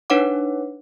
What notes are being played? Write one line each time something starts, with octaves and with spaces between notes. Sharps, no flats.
D4 D#4 B4 C#5 F#5 D6